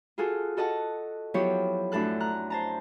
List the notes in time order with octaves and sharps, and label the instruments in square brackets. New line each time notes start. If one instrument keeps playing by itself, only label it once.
[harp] F4 F#4 G#4 A4
F#4 A4 D#5 F#5 A5
F3 F#3 B3 E4 G4 C#5
F#2 A2 D4 A4 F#6
A#5 F#6
C5 A5 A#5